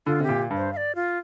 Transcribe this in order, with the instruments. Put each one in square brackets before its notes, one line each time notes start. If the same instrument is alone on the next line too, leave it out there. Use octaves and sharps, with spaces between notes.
[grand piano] D3 [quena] F4
[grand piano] C3 [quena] G4
[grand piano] A#2
G2
[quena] C5
F5
D5
F4